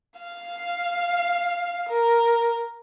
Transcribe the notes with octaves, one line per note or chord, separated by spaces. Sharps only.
F5
A#4